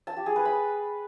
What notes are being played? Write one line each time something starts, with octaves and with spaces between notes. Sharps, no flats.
A5
G4
G#4
B4
B5